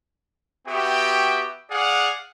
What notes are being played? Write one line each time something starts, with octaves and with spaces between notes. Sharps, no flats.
B3 F#4 G4 E5 G5
G#4 D5 F5 F#5